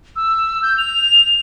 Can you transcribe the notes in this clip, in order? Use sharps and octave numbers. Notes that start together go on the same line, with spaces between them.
E6
G6
F7